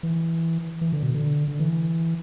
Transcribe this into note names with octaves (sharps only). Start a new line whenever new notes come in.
E3
E3
D3
B2
D3
D3
E3